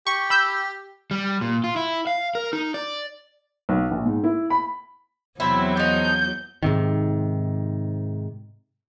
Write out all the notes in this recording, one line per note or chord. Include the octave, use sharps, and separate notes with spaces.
G4 C#6
B5 E6 G6
G3
A#2
F4
E4
F5
A#4
D#4
D5
B1
A#1
G#2
E4
B5
E2 C3 F#3 C4 E4
F3 D#4 G6
G#2 C3 D#3